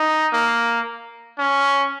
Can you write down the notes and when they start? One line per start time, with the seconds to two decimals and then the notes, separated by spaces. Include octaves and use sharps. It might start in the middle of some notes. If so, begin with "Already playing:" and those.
Already playing: D#4
0.33 A#3
1.39 C#4